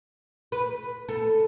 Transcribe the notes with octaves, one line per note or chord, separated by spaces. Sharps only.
B4
A4